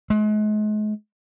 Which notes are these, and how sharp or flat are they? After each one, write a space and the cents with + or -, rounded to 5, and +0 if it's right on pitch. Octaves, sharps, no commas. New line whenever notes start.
G#3 +40